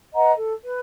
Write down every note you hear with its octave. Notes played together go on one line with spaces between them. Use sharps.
B4 D#5 F#5 A#5
A4
B4